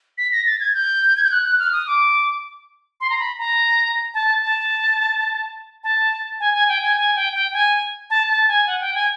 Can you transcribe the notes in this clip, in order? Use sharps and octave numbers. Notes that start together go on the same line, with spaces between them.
B6
A#6
A6
G#6
G6
G#6
G6
F#6
F#6
F6
D#6
D6
C6
A#5
B5
A#5
A5
A5
A5
G#5
G#5
G5
G#5
G#5
G5
G5
G#5
A5
A5
G#5
F#5
G5
G#5